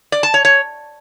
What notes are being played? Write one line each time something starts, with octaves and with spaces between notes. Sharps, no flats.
D5
A5
C#5
C#5